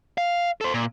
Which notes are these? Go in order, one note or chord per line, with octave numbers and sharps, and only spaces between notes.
F5
A4 C5
A#2